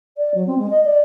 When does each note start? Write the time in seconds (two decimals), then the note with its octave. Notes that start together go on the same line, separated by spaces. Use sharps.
0.17 D5
0.34 F#3
0.46 C4
0.58 G#3
0.70 D#5
0.84 D5